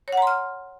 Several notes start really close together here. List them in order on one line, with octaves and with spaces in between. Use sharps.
C#5 F#5 A#5 C6 F6